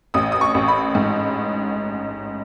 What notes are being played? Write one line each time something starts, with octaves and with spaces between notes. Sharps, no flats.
A1 D#6
D#6
C#6
A1
B5
G#2